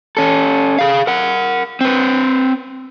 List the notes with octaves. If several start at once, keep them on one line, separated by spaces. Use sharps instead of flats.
C#4 A4
G#4 F5
A#4 F#5
C4 B4